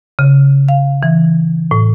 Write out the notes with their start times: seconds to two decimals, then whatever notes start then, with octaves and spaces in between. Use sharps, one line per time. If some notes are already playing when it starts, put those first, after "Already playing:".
0.19 C#3
0.69 F5
1.03 E3
1.71 A2